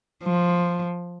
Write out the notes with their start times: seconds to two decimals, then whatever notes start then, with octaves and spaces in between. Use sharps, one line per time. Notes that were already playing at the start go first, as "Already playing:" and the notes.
0.24 F3